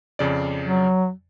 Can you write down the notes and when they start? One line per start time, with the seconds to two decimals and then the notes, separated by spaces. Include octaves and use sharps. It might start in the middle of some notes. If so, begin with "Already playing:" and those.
0.19 F2 C#3 D5
0.65 F#3